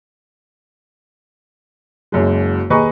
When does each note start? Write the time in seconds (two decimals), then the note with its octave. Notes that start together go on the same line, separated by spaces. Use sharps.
2.12 F#1 F#2 G#3
2.70 D#2 G#4 B4 D#5 A#5 C#6